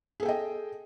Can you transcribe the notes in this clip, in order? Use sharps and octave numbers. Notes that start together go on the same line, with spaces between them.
G#4 A4 D#5 G5